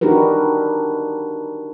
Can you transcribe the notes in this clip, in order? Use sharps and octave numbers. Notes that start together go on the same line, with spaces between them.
D4 D#4 F#4 G4 A#4 B4